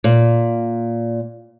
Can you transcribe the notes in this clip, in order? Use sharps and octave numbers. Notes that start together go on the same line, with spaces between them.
A#2